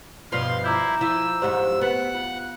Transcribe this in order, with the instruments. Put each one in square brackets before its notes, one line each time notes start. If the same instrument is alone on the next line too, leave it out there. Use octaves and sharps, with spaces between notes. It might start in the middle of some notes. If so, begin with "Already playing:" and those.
[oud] G2 B2 F3 [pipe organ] F5 C6
[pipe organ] E4 [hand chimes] A#5 D6 G6
[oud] F3 E4 [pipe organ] E6
[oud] F2 G#2 F#3 [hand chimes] G4 C5
[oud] B3 [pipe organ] F#5
[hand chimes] F4